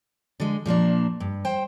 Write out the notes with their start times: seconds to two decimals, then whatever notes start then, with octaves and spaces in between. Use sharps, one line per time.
0.40 D3 G#3
0.66 A#2 F3 A#3 D4
1.20 G2
1.45 C5 G5